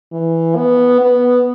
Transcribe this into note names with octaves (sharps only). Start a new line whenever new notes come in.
E3
B3
B3